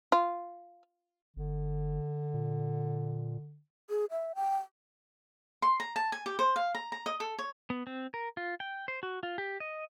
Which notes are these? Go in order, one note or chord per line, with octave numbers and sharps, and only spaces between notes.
F4
G1 D3
A#2
G#4
E5
G5
C6
A#5
A5
G#5
G4
C5
F5
A#5
A#5
D#5
A4
C#5
B3
C4
A#4
F4
G5
C5
F#4
F4
G4
D#5